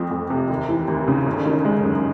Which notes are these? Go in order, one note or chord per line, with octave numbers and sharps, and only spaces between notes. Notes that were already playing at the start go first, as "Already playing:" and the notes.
Already playing: F2 F3
F2
C3
D#2
E3
D#2
C#3
G1
D#3
G#3
F#2